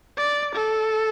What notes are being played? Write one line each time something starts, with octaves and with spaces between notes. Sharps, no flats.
D5
A4